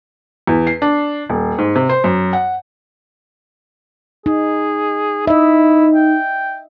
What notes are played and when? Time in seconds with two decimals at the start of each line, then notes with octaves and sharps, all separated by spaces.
0.47 E2
0.67 C7
0.82 D4
1.29 D#1
1.58 G#2
1.75 C3
1.89 C5
2.04 F#2
2.33 F#5
4.26 D#4 G#4
5.27 D#4 E4 D#5 E5
5.94 G5